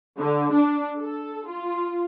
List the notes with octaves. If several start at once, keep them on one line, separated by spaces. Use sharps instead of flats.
D3
D4
A4
F4